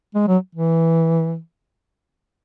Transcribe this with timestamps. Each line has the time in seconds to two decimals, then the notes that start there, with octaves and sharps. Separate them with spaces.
0.15 G#3
0.28 F#3
0.55 E3